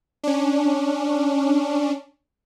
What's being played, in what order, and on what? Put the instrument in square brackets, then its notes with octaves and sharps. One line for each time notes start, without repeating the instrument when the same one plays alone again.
[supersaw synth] C#4 D4